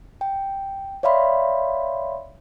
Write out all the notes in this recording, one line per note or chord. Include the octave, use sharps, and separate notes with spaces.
G5
C#5 D5 E5 F5 B5 C6